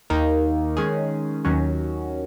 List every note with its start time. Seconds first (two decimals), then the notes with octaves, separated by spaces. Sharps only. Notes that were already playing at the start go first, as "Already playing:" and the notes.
0.10 D#2 D#3 A#3 D#4
0.77 D#3 G#3 C#4 G#4
1.45 D#2 D#3 F#3 C#4 F#4